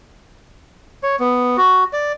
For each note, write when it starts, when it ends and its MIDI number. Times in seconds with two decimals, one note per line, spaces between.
1.03 1.16 73
1.20 1.57 59
1.57 1.84 66
1.93 2.12 74